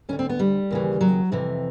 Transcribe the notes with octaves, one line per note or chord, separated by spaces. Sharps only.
D2 D3 C#4
C4
B3
G3
D#2 C#3 E3
F#3
F2 C3 E3